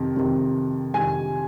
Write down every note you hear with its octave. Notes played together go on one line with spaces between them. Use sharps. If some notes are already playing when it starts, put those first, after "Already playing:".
Already playing: F2 C3 D#3
F2 C3 D#3
F2 C3 D#3 G#5